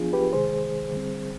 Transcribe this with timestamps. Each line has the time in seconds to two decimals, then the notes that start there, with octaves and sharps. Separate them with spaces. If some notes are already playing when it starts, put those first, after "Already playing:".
Already playing: F3 B3 D4 F4 G#4
0.13 G4 B4
0.33 C3 D#3 G#3 G#4 C5
0.92 D3 G3 C4